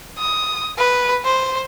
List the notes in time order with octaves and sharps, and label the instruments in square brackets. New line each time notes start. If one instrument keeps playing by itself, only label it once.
[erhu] D#6
B4
C5